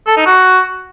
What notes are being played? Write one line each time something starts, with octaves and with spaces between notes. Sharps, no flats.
A4
D#4
F#4